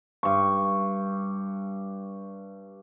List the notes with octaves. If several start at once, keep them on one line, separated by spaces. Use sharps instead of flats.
G2 C#6